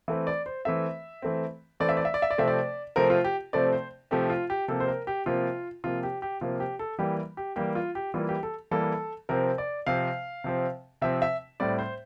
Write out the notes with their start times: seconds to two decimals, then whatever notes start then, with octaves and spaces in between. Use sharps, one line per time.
0.08 E3 A3 C4 E5
0.27 D5
0.46 C5
0.65 E3 A3 C4 E5
1.22 E3 A3 C4
1.80 E3 A3 C4 D5
1.89 E5
1.97 D5
2.05 E5
2.14 D5
2.22 E5
2.31 D5
2.38 C3 F3 A3 C4 E5
2.47 D5
2.96 C3 F3 A3 C4 A#4
3.10 F4
3.24 G4
3.53 C3 F3 A3 C4 D5
3.73 C5
4.11 C3 F3 A3 C4 G4
4.30 F4
4.50 G4
4.68 C3 F3 A#3 A4
4.80 C5
4.88 A#4
5.07 G4
5.26 C3 F3 A#3 F4
5.84 C3 F3 A#3 F4
6.03 G4
6.22 G4
6.41 C3 F3 A#3 F4
6.60 G4
6.79 A4
6.99 E3 G3 A#3 G4
7.37 G4
7.56 E3 G3 A#3 G4
7.75 F4
7.95 G4
8.14 E3 G3 A#3 F4
8.29 G4
8.43 A4
8.71 E3 G3 A#3 A4
9.29 C3 F3 C4 A#4
9.58 D5
9.86 C3 F3 C4 F5
10.44 C3 F3 C4
11.02 C3 F3 C4 E5
11.22 E5
11.60 A2 G3 C4 D5
11.79 C5